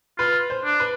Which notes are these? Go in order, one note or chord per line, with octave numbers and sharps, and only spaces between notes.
F4 B4
C5
D4
B4